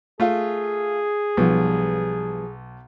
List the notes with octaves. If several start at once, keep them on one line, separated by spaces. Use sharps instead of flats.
A3 F4 G#4
B1 F3 G3 B3